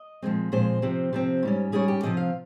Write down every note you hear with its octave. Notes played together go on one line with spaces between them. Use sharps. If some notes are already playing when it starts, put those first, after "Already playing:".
Already playing: D#5
A#2 F3 G#3 C4
A#2 F3 G#3 C4 C5
C3 F3 C4
C3 F3 C4
G#2 G3 C#4
G#2 G3 C#4 G#4
G4
C3 F3 C4 D#5
F5